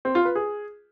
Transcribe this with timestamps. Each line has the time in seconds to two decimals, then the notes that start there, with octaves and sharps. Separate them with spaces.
0.05 C4
0.15 F4
0.25 B4
0.35 G#4